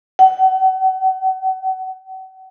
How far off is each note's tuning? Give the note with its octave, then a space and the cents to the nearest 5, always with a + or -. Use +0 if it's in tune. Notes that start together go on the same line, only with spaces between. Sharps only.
F#5 +40